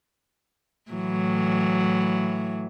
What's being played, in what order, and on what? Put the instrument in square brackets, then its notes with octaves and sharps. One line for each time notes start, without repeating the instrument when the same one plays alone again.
[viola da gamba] A2 E3 F#3